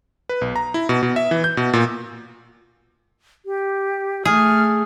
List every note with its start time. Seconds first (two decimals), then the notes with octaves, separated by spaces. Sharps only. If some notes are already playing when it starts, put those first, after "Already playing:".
0.29 B4
0.41 B1
0.56 A#5
0.74 E4
0.89 B2
1.03 B2
1.16 E5
1.31 E3
1.44 G6
1.57 B2
1.73 A#2
3.46 G4
4.25 A3 G#4 F6